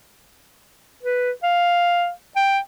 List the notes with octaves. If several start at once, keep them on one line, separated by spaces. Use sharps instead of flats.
B4
F5
G5